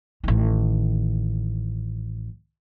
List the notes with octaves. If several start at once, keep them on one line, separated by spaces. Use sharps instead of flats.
A1 D#3